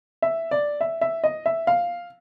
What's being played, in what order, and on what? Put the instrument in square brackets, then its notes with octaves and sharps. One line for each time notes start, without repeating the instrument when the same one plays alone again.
[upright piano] E5
D5
E5
E5
D#5
E5
F5